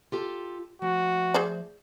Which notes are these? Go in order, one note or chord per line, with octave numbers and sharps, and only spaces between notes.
F4 G4 A4
F3 A3 F#4
G#4 C5 D5